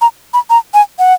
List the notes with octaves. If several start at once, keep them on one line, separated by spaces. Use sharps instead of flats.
A#5
B5
A#5
G#5
F#5